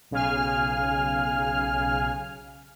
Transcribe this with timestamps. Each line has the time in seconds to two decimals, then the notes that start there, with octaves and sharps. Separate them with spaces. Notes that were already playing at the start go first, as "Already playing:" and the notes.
0.11 B1 C#3 F5 G#5 F6